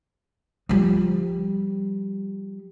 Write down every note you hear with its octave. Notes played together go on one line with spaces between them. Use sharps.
F3 G3